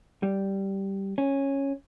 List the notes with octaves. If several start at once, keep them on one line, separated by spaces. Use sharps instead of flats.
G3
C#4